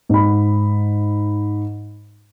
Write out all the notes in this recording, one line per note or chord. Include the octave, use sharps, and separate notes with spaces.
G#2 B5